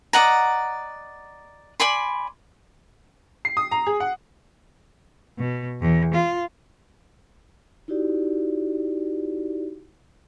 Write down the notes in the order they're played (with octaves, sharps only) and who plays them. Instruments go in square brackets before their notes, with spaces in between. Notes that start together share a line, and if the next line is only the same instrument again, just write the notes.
[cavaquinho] D5 D#5 F#5 A#5
D5 G#5 B5 C6
[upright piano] C7
D#6
A#5
G#4
F#5
[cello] B2
E2
F4
[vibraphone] D#4 E4 F#4 G4 D5